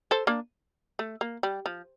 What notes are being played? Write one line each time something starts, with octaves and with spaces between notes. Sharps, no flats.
A4 C5
A#3 D4
A3
A#3
G3
F3